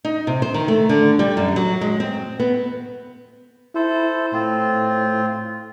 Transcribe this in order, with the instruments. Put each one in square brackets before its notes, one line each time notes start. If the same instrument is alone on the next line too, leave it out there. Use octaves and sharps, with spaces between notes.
[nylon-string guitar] D#4
C3
C5
D#3
A3
D3
G3
F#2
F#3
G#3
C4
B3
[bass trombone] E4 [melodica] A4 C5
[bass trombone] A2 [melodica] C4 F4